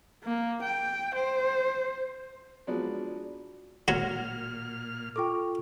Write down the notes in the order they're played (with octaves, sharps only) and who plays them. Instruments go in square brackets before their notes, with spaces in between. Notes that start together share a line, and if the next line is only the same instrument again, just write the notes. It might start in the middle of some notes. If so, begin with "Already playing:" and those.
[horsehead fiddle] A#3
G5
C5
[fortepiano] F3 F#3 G#3 B3 D4
[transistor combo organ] A#2 F6 [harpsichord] F#3 F#4 [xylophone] A#6
[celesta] F4 A4 [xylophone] G5 C#6 D6